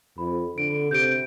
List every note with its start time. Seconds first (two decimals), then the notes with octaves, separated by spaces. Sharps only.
0.18 F2 B5
0.58 D3 D7
0.91 C3 G6 D7